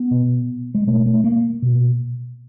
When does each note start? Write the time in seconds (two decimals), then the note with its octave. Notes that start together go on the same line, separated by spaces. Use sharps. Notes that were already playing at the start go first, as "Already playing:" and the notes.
Already playing: B3
0.11 B2
0.75 G#3
0.87 B2 A3
1.06 A3
1.24 A#3
1.62 B2